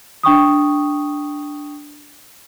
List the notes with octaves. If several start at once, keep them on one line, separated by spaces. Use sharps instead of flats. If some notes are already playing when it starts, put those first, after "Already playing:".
D4 G5 C#6 D#6